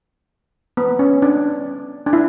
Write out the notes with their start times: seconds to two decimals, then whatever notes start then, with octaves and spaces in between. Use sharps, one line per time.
0.77 B3
0.99 C#4
1.22 D4
2.06 D4
2.13 E4